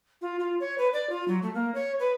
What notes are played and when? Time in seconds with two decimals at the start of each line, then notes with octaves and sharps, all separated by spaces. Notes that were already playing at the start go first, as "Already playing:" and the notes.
0.22 F4
0.39 F4
0.60 C#5
0.78 B4
0.93 D5
1.10 F4
1.28 F#3
1.43 A3
1.54 A#3
1.75 C#5
2.00 B4